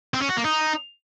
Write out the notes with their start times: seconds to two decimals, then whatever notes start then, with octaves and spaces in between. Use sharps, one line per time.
0.14 C4
0.21 C#4
0.29 F#4
0.37 A#3
0.44 D#4